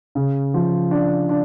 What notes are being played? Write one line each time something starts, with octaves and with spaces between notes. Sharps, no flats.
C#3
F3
D4
D4